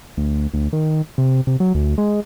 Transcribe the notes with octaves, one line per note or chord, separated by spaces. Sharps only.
D2
D2
D#3
C3
C3
F#3
D2
G#3